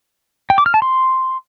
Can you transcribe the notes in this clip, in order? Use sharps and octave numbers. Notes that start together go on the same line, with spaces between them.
G5
D6
F6
A5
C6